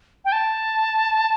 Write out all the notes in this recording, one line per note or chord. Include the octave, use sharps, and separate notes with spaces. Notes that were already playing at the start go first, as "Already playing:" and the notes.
G5
A5